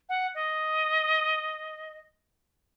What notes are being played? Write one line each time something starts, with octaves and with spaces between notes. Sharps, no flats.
F#5
D#5